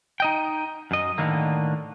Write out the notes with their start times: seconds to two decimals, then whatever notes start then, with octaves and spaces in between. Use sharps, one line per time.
0.20 D#4 D#5 G5
0.91 F#2 D#5
1.18 A2 D3 D#3 A#3